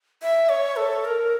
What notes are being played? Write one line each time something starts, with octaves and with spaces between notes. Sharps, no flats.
E5
C#5
A4
A#4